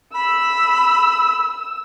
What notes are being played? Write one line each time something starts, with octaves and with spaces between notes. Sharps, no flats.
B5 E6